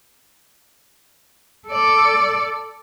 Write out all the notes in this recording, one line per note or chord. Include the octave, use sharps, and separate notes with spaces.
A4 D5